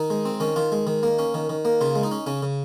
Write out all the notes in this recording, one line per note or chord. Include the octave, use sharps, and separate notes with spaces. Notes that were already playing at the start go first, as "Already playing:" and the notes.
Already playing: D#3 D#4
G#3
C4
D#3 C#4
D#3 F4
G#3
D#3
A#3
C#4
D#3
D#3
A#3
C#3 F4
G#3
D#4
C#4
C#3 C#4
C#3